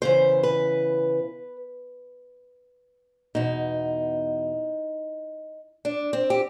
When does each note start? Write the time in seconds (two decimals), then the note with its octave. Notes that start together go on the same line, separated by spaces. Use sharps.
0.02 E2 C#3 E3 C5
0.43 B4
3.35 E2 B2 D#4
5.85 D4
6.13 C4
6.30 G4